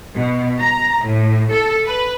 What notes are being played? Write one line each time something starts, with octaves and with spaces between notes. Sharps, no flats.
B2
A#5
A2
A4
B4